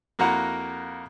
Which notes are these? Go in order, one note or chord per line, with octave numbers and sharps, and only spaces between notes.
F2 A#3 E4 F#4 F#5 A#5